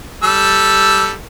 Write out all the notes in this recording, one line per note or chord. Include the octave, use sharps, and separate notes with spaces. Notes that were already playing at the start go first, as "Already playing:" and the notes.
G3 A4 E6